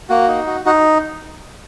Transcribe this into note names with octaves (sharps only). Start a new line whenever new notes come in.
A#3 F#4
D#4
F#4
D#4 F#4